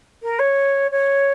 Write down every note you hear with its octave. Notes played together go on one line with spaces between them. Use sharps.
A#4
C#5
C#5